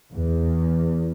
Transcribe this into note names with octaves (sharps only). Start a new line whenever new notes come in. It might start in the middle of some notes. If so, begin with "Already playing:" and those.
E2